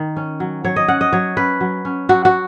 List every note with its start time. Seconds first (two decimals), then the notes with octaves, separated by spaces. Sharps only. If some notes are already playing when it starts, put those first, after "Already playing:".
Already playing: D#3
0.17 C#4
0.40 F#3
0.64 F#3 C#5
0.76 D#5
0.88 C#4 F#5
1.01 D#5
1.13 F#3 C#5
1.37 C#4 B4
1.61 F#3
1.85 C#4
2.09 F#3 F#4
2.25 F#4